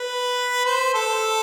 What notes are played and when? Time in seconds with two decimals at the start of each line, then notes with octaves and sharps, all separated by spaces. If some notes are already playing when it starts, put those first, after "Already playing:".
Already playing: B4
0.65 C5
0.94 A4